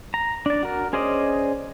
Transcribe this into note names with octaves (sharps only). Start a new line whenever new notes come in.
A#5
D4 D5
F#4 A#4
C#4 G#4 C5 D5 D#5